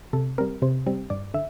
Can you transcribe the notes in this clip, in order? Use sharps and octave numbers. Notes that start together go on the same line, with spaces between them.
C3 A4
G3 C4 A#4
C3 C5
G3 C4
G2 D5
D3 E5